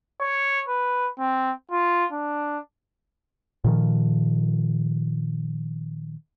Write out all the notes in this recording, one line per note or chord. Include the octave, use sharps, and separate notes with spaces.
C#5
B4
C4
F4
D4
A#2 D#3 F3